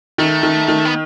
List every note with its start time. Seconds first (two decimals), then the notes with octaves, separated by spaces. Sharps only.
0.18 D#3 A3
0.43 D#3
0.68 D#3
0.85 B3